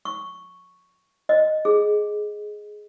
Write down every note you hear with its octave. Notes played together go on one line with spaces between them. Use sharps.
C#6
D#5
G#4